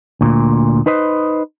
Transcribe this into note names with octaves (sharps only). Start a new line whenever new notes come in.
D2 A#2
D#4 B4 C5 D#5